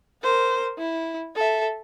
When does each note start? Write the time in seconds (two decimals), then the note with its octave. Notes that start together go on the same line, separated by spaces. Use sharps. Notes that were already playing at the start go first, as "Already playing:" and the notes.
0.23 A#4 C5
0.78 E4
1.36 A4 E5